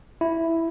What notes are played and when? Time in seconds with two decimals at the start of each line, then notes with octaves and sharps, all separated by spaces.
0.21 E4